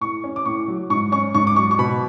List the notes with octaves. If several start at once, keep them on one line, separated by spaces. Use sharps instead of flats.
A2 C#6
C#4
D6
A2 C#6
F#3
G#2 C#6
C#4 C#6
G#2 C#6
D6
F#3 C#6
C#6
B2 B5